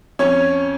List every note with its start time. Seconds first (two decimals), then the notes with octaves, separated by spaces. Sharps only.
0.19 F2 C#4 C#5